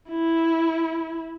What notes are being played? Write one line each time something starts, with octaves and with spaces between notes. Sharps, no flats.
E4